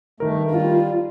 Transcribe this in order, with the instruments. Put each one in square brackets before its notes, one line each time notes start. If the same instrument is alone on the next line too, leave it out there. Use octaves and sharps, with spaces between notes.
[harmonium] G2 A3 [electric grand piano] D#3 A#4
[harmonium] G3 [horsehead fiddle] F4